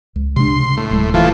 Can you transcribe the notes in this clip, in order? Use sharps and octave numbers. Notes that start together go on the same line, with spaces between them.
C#2
C3 G#3 D4 C6
C#3
A2
D1 G#3
E3 F3 A3